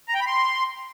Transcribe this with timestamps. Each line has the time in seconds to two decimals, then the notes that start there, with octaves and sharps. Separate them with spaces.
0.09 A#5
0.15 G5
0.21 B5
0.27 C6